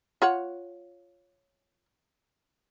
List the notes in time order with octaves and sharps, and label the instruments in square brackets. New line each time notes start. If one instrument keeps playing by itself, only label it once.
[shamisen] F4 C#5 F#5